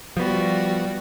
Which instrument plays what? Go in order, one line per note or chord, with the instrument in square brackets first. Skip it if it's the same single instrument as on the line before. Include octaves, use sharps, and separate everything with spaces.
[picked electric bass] F3 B3 [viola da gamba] G3 F#4